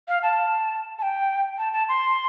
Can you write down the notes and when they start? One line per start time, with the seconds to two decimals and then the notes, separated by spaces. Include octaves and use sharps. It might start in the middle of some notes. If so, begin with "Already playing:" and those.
0.08 F5
0.23 A5
0.99 A5
1.02 G5
1.58 A5
1.73 A5
1.89 C6